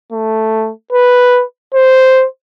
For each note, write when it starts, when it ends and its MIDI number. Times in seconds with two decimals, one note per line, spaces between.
0.12 0.71 57
0.93 1.44 71
1.74 2.25 72